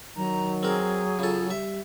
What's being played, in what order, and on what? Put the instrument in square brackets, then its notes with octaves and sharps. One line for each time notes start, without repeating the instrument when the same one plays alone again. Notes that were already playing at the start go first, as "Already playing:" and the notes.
[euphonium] D#3 [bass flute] F#3 [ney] A#5
[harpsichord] C4 A#4 [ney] G#4
[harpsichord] C#3 A4 [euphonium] F4
[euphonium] G3 [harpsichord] E5